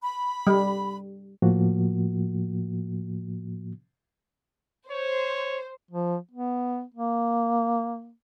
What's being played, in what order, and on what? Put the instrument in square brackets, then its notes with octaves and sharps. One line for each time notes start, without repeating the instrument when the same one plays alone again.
[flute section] B5
[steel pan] G3
[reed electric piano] A2 F3 A#3 F#4
[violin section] C5 [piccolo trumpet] C#5
[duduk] F3
B3
A#3